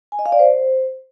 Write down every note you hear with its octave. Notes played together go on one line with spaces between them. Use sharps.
G#5
D#5
F5
D5
C5